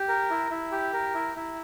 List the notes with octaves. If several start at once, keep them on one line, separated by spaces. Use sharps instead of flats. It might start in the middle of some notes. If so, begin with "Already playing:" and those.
Already playing: G4
A#4
E4
E4
G4
A#4
E4
E4